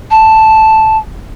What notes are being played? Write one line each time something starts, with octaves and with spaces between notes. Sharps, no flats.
A5